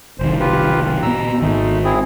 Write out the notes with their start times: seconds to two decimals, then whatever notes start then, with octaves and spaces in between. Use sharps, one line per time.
0.19 F#1 C2 D#3 C5
0.40 F4 G4 B4
1.03 A#2 B3 A#5 E6
1.42 G#1 G#2 D#3 G#3 A3 D#4
1.84 C4 E4 G#4